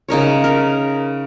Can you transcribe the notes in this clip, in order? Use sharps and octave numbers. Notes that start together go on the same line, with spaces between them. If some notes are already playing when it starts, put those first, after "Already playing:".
C#3 D#4 A#4 C#5
A#4